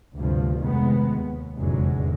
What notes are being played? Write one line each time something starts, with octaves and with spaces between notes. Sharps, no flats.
D2 G2 C3 F3
F1 D#3 G#3 B3
D#2
F1 E2 G#2 D3 F#3 G#3